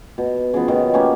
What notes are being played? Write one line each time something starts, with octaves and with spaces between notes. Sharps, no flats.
B2
C#3 F3 B3
B2 D#3
A#3 B3 C#4 G4